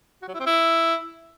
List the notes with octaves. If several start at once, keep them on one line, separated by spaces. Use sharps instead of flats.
F#4
F#3
E4
C4
E4